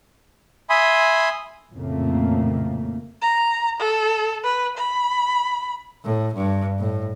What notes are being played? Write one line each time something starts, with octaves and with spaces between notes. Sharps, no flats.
E5 G#5 B5 C6 D#6
A1 F2 A#2 C#3 A3 A#3
A#5
A4
B4
B5
A2
G2
A2